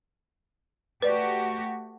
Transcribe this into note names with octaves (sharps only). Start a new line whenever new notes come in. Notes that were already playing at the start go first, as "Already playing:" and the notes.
A3 F#4 G4 B4 D5